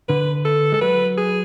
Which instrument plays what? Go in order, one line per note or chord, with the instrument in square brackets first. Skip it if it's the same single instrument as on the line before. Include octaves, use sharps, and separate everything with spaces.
[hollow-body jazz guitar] D3 [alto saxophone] B4
[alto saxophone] A4
[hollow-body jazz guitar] G#3 [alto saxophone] A4
[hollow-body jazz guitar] F#3 [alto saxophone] B4
[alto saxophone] G#4